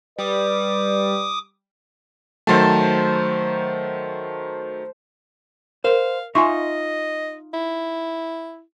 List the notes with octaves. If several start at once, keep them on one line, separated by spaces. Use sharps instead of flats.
G3 B4 D5 D6 D#6
D#3 F#3 A3 C5 A5
A#4 C5 F5
D#4 F4 D#5 E5 G#5 C6 C#6
E4